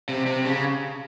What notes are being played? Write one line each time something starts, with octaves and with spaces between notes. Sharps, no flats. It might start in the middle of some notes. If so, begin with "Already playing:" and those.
C3
C3
C#3